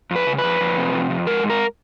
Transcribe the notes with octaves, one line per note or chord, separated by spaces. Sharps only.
F2 B4
C#3
B4
F2
F2
C3
F2
F2
G#3 A#4
G#2
A#4